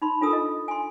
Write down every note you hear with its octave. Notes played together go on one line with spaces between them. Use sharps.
D#4 B5 C6
D4 F4 A4 A#4 D#6 E6
D#5
G#5 C6